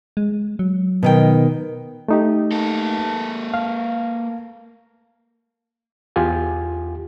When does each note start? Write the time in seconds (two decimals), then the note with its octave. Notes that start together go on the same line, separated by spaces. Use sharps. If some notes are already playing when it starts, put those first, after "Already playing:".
0.17 G#3
0.59 F#3
1.03 B2 D#3 G5
2.08 A3 D#4 G4
2.52 A#3 A4
3.54 F5
6.16 E2 F4 G4 G#5